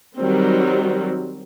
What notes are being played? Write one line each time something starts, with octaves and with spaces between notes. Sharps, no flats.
D#3 F#3 G3 C4